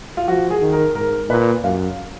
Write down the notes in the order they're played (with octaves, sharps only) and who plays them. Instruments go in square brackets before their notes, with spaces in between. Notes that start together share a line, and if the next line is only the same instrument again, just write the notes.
[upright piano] F4
[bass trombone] F3 [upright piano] F#4
[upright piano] G#4
[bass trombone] D#3
[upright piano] A#4
[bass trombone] G#2 [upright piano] A#4
[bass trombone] A#2 [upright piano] B4
[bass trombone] F#2 [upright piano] F5